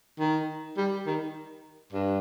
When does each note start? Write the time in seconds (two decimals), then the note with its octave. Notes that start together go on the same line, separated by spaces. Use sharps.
0.20 D#3
0.77 G3
1.06 D#3
1.93 G2